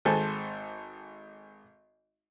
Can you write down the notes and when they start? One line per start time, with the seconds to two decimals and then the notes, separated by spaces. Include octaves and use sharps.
0.05 G#1 G#3 A4 C5 G#5